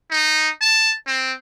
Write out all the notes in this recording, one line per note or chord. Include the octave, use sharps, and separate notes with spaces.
D#4
A5
C4